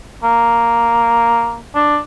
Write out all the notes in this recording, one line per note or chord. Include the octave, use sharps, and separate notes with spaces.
A#3
D4